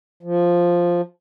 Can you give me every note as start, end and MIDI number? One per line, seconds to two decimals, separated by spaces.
0.23 1.01 53